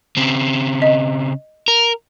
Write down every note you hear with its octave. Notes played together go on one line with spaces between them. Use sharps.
C#3 C4
D#5
A#4